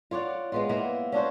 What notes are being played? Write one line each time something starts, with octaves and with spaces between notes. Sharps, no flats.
F4 C#5 D5 F#5
G#3 B3 F4
A#3 B3 E4
C#4 D4 F#4 C5